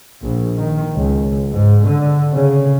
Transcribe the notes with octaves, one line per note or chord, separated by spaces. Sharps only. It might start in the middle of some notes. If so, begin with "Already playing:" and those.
A#1
D#3
C#2
G#2
D3
C#3